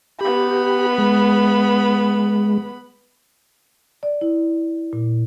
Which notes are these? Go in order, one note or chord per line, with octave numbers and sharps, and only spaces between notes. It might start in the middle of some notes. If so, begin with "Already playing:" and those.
B3 G4 B5
G#3
D5
E4
A#2